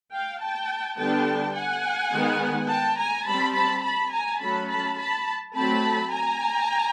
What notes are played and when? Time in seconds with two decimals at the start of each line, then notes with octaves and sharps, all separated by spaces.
0.13 F5 G5
0.42 G5 A5
0.98 D3 G3 B3 D4 G5 A5
1.56 F#5 G#5
2.12 D#3 G#3 B3
2.69 G5 A5
2.98 G#5 A#5
3.26 G3 C4 A5 B5
3.55 A5 B5
3.84 A5 B5
4.12 G#5 A#5
4.41 F#3 A3 C#4 A5 B5
4.69 A5 B5
4.98 A5 B5
5.55 F#3 A3 C4 A5 B5
6.13 G#5 A#5